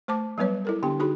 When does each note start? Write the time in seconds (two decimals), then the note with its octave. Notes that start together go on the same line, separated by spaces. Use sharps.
0.08 A3 C5 A5 D6
0.38 F#3 G3 B3 B4 C#5
0.65 E4 A4 A#4
0.83 D3 B3 D4 G4 G5
0.99 D#4 F#4 G#4 B5